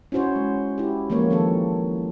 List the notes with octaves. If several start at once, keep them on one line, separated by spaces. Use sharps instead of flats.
C#4 E4 F#4 C5 C#5
G#3
E4 G4
E3 F3 G#3 A#3 A#4 C#5
D#3 F3 C4 A4